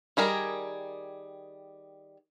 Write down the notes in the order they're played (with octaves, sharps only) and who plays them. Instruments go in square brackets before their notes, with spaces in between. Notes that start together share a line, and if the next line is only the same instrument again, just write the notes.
[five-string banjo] D#3 G3 G#4 A#4